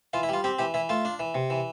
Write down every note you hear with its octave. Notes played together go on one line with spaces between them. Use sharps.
E3 F4
E4
G3 F4
C4 G4
E3 G4
E3 E4
A3 F4
D4
E3
C3
E3